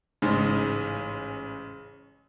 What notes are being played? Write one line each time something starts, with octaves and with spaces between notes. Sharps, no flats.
A1 G#2 C#3 G#3